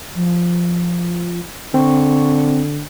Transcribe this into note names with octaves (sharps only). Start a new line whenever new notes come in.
F3
D3 C4 C#6